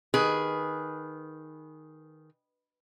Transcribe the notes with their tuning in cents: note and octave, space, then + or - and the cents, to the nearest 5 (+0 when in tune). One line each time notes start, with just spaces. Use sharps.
D#3 +0 G#4 +0 B4 -5